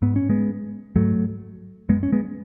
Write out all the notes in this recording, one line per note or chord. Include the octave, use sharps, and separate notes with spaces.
G#2 B3
C#4
G#3 B3
G#2 F#3 A3
F#2 G#3 B3
C#4
G#3 B3